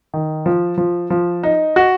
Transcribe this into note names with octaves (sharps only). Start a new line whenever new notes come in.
D#3
F3
F3
F3
D#4
F#4